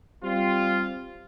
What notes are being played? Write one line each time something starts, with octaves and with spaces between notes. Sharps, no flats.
G3 C4 F4